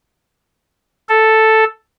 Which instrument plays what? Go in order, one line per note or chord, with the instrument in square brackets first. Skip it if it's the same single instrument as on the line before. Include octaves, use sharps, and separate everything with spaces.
[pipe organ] A4